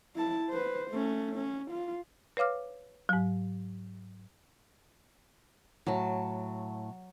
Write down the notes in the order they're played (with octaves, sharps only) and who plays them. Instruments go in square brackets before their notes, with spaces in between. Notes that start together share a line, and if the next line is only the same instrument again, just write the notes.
[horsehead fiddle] E4 A5
B4 C5
A3 C#4
C#4
F4
[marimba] B4 C#5 F5 D6 F6
G#2 F#3
[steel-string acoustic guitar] A2 A5 [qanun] F#3